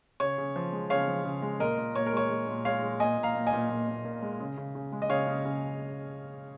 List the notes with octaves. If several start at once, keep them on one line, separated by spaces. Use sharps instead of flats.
C#3 C#5
C#3
F3
G#3
C#3 C#5 F5
F3
C#3
G#3
A#2 A#4 D#5
A#2
A#2 C#5
A#4
G#3 C#5
G#3
A#2
G#3 C#5 F5
G#3
A#2 D#5 G#5
A#2
F5 A#5
A#2
D#5 G#5
A#2
A#2
A#2
A#2
G#3
C#3
C#3
C#3
G#3
D#5
C#3 C#5 F5
C#3
C#3